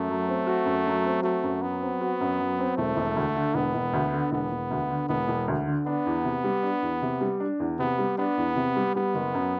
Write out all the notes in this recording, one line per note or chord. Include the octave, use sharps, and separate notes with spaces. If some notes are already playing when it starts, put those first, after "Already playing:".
Already playing: F#2 A3
F#3
C4
F#4
F#2
F#3
C4
A3 F#4
F#2
F#3 B3
C4
F#4
F#2
F#3
C4
E1 A3
E1
D2
D3
E1 B3
E1
D2
D3
E1 B3
E1
D2
D3
E1 B3
E1
D2
D3
B3 D4
E2
C3
G3
D4
E2
C3
G3
D4
E2
C3 B3
G3
B3 D4
E2
C3
G3
G3 B3
F#1
F#2